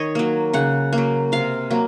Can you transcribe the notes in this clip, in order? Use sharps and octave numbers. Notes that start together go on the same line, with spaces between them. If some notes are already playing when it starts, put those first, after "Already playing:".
Already playing: D#3 C#5 D#5
F#3 A#3
C#3 F#5
A#3
F#3
C3 F5
F#3 A#3